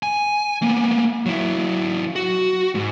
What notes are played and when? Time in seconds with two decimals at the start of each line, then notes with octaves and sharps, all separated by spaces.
0.03 G#5
0.62 A#3 B3
1.26 F#3 E4
2.16 F#4
2.75 G#2